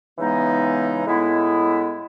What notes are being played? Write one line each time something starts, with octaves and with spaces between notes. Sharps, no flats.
C#3 E3 G#3 B3 D#4
A2 G#3 B3 E4